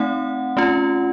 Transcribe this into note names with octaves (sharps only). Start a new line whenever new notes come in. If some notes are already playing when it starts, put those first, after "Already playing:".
Already playing: A3 C4 D#4 F#5
A3 C#4 F4